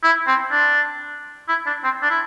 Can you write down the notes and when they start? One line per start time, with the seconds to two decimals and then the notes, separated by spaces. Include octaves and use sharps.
0.03 E4
0.27 C4
0.51 D4
1.49 E4
1.66 D4
1.84 C4
2.02 D4
2.10 E4